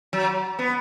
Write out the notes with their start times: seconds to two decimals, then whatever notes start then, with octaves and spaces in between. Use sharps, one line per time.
0.13 F#3
0.59 B3